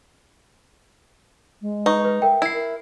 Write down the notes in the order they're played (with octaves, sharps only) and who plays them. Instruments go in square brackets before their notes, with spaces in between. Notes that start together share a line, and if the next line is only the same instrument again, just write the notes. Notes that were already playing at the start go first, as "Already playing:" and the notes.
[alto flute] G#3
[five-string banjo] D#4 [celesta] B4 C#6
[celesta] B4
[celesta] A#4 G5 [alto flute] E5
[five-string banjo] E4 [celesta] E5 C7
[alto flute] A#4